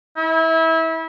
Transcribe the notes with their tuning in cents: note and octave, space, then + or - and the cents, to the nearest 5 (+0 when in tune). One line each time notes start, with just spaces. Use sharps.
E4 -25